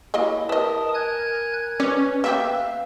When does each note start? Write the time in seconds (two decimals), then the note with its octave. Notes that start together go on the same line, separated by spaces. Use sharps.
0.14 F#3 A#3 E4 D#5
0.49 A#4 B4 D#5 A5 D#6
0.94 G#5 F#6 G#6
1.80 C#4 B4 D5
2.24 A#3 B3 G4 E5 F5